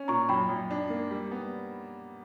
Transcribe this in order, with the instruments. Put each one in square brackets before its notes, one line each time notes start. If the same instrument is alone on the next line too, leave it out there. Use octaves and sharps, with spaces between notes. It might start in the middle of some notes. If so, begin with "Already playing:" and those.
Already playing: [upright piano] C#4
[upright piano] A#2 [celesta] A#5 C#6
[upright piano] F#2 [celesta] G5 B5
[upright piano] F#2
D4
A#3
G3
B3